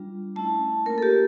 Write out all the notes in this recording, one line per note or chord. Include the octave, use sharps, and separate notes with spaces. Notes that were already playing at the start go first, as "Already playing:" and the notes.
Already playing: G3 D4 F4
A3 C#4 E4 A5
A#3 D4 F4 A#4
A4
G4